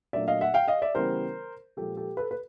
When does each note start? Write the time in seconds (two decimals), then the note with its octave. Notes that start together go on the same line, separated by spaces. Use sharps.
0.13 A#2 F#3 A3 D4 D5 E5
0.28 D#5 F5
0.41 E5 F#5
0.54 F5 G5
0.68 D#5 F5
0.82 D5 E5
0.95 C#3 E3 G3 B3 A#4 C5
1.77 A#2 F3 G#3 G4 A4
1.97 G4 A4
2.17 A4 B4
2.31 B4